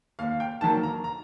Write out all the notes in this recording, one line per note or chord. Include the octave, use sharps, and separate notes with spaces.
D#2 F5
G5
D#3 F#3 A#3 A5
A#5
A#5